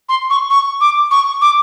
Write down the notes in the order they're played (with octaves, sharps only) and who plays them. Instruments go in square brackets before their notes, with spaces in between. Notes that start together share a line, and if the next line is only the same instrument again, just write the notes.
[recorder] C6
C#6
C#6
D6
C#6
D6